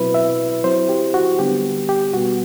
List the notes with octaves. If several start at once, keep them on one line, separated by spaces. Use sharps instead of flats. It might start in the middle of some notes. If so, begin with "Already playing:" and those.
Already playing: B2 F#3 C4 E4 B4
E5
F#3 C4 E4 C5
G4
F#4
D3 G3 B3 D4 G4
G4
B2 G3 B3 F#4